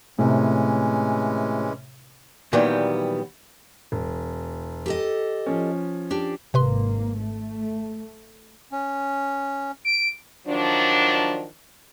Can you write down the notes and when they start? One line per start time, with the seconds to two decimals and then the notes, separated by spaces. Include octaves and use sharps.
0.19 A2 C3 E3 G#3 C#4
2.53 A#2 D#3 E3 F#3 G3 B3
3.92 E1
4.86 G4 A4 D#5
5.46 F3 C#4
6.11 D4 G4
6.54 G#1 C3 A#3 B4 C6
7.20 A3
8.72 C#4
9.85 D7
10.47 D#3 F3 F#3 D4